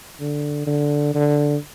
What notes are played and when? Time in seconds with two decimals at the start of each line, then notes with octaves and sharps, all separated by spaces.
0.20 D3
0.67 D3
1.15 D3